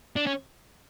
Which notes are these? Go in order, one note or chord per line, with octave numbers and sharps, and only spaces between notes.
D4
C#4